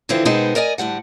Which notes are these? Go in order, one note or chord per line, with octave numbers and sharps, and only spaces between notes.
D3 E3 F3 C4 E4
B2 G#3 B3 C4 D#4 A#4
A#4 D5 D#5 G#5
D2 A2 G3 F#5